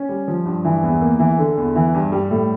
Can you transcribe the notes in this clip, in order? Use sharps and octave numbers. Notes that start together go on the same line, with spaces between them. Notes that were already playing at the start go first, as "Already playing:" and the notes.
Already playing: C#4
G3
F3
G2
E3
E2
A#3
E3
D3
E2
E3
G2
G3
A2